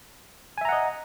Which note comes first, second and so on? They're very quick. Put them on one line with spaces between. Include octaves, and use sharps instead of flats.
G#5 E5 A#5 F#5 D#5